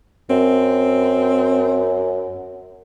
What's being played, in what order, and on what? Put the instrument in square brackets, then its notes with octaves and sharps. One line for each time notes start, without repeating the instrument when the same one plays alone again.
[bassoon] F#2 [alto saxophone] C4